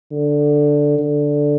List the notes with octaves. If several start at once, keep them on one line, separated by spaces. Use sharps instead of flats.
D3
D3